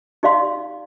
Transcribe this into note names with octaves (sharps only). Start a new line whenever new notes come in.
D#4 G4 D5 F5 C6